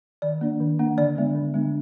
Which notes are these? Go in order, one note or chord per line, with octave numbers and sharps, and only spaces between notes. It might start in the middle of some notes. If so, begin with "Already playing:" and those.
D#3 D5
A#3 D4
D#3
A#3 D4
D3 D5
G#3 B3 D4
D3
G#3 B3 D4